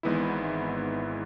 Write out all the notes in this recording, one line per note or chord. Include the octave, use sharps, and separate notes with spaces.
G#1 G#2 E3 B3 E4